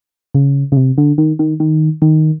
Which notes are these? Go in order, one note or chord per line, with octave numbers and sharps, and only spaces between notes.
C#3
C#3
C3
D3
D#3
D#3
D#3
D#3